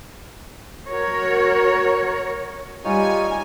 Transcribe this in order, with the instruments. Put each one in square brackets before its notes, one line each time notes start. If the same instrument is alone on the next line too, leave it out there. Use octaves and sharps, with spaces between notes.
[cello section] F#4 A#4 C#5
[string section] G3 G#5 [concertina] D#4 F4 C#5